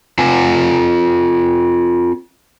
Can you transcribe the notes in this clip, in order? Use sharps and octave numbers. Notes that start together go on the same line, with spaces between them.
C4 F4 G#5